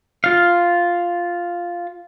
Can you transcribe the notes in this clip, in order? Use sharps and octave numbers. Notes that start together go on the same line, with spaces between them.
F4 F5